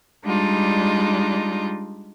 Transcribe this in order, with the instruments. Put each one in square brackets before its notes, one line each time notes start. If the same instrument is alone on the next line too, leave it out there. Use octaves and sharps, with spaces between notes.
[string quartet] G3 G#3 D4 D#4 F4